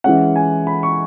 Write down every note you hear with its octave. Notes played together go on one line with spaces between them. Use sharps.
E3 G#3 C#4 F#5
G#5
B5
C#6